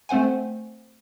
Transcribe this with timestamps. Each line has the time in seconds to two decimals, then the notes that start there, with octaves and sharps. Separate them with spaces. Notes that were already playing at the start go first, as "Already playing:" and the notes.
0.09 A3 C4 C5 F#5 G#5